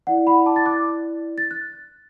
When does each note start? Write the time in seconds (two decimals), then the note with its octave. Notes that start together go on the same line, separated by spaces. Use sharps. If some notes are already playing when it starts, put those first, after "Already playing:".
0.07 E4 D5 F#5
0.27 F#5 B5
0.46 A5 D6
0.56 A6
0.66 D6 F#6
1.38 A6
1.51 F#6